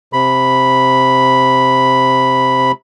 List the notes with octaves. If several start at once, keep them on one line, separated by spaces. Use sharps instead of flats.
C3 B5